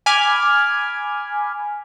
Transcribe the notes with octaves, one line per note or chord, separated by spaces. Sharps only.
G#5 B5 D6 F6 G#6